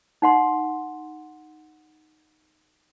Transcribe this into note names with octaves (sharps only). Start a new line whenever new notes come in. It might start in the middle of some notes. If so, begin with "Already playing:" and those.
D#4 F#5 C6